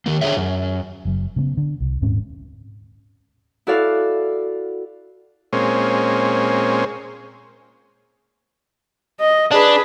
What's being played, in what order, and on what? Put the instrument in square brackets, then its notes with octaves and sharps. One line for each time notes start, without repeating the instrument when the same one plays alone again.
[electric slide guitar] D#3 A#3
D3 G#4 C#5 E5
F#2
[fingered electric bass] F#1 F#3
C#3 A3 B3
D3
C2
D#1 G#2 C4 C#4
[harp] E4 F#4 A4 D5 F5
[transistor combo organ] A#2 G#3 C4 C#4
[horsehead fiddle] D#5
[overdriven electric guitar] D4 [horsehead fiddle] G#4 B4